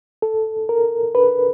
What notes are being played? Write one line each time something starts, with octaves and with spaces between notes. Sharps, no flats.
A4
A#4
B4